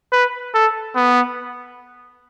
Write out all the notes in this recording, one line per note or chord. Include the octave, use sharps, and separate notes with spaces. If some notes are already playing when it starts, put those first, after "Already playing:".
B4
A4
B3